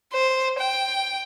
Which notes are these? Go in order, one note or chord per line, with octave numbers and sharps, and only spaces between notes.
C5
G5